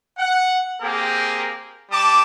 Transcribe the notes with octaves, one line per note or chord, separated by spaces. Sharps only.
F#5
A#3 C4 G4 G#4 A#4
G3 A5 D6